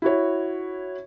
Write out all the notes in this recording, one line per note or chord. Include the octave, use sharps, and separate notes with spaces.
E4 F#4 C#5